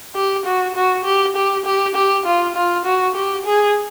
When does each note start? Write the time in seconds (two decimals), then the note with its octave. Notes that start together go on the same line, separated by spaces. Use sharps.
0.15 G4
0.45 F#4
0.75 F#4
1.05 G4
1.36 G4
1.65 G4
1.95 G4
2.26 F4
2.56 F4
2.85 F#4
3.15 G4
3.45 G#4